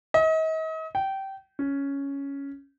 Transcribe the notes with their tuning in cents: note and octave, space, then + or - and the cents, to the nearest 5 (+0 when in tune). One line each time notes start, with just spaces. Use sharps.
D#5 +40
G5 -20
C#4 +5